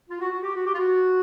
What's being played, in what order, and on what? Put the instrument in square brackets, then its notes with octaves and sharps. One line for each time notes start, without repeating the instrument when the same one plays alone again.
[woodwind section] F4
F#4
F#4
G4
F#4
G4
F4
F#4